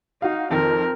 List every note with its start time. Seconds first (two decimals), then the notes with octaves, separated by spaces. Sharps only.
0.22 D#4 F#4 F5
0.51 F2 D#3 C4 A#4